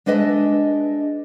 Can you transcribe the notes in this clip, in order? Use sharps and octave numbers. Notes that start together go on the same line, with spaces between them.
G#3 D4 B4 D#5 E5